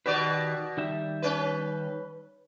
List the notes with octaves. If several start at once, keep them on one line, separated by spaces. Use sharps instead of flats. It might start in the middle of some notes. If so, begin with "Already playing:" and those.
B2 D#3 F#4 G4 B4 D5
D#3 G3 E5
C#4 B4